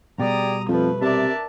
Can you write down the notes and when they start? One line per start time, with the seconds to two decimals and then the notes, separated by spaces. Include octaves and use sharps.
0.20 B2 G3 G4 G#4 D5 A#5 D#6
0.69 F2 F3 A3 B4
1.01 C3 D4 A#4 D5 E5 A5